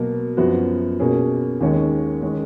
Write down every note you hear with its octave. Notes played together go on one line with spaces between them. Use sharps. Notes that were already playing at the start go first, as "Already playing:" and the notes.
Already playing: B2 F#3 A#3
F#2 F3 B3 F#4
B2 A#3 C#4 G#4
D#2 D#3 G#3 C#4
D#3 G#3 C#4